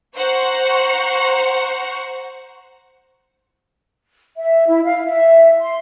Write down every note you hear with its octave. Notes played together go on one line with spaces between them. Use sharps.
C5 F#5 A#5 C#6 C#7
E5
E4
F5
E5
C6